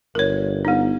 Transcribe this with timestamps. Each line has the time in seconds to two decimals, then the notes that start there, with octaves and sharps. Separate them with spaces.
0.15 G1 A#4 C#5
0.65 B3 D#4